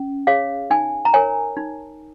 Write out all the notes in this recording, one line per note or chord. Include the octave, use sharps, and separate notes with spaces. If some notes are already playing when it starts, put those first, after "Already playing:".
Already playing: C#4
G#4 C#5 F5
D#4 G#5
A#5
A#4 C#5 G#5
D#4